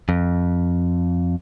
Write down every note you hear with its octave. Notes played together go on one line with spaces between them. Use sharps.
F2